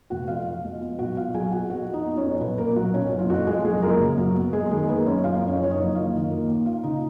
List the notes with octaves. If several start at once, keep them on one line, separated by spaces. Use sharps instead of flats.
F1 F#4 F#5
F2 F4 F5
F3
G#3
B3
B1 F#4 F#5
B2 F4 F5
F#3 G#4 G#5
B3 F#4 F#5
F2 F#4 F#5
F3
D#4 D#5
B3
C#4 C#5
F2
B1 B3 B4
A#2 A#3 A#4
F#3 F#4
B1 C#4 C#5
F#1
F4
F2 F#4
F3 G#3 G#4
F#1 G#3 G#4
F#2 A#3 A#4
C#3
F#3
B3
F#2 G#3 G#4
D#3 G#3 G#4
A#3 B3 B4
F#2 C#4 C#5
F#1 F4 F5
F2
C#4 C#5
F3 C#5
D#4 D#5
F#1
D#2 F4 F5
D#3
A#3
D#2
D#2 F4 F5
C#3 D#4 D#5